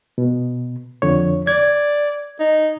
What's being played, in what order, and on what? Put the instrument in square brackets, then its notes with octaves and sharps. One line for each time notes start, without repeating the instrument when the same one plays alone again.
[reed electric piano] B2
F2 D3 C#5
[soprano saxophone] D5 [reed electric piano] G#6
[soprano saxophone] D#4